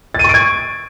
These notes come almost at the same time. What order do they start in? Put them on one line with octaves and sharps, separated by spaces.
A6 D#7 C#6 D7 G#6